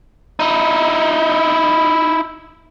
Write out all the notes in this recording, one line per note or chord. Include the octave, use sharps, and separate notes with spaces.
D#4 E4